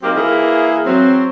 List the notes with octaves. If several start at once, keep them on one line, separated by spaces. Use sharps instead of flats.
F#3 A#3 C4 D#4 G4
E3 A#3 G#4
F#3 C4